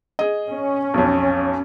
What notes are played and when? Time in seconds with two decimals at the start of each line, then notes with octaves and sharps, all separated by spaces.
0.19 G#4 D#5
0.50 C#4
0.94 B1 F2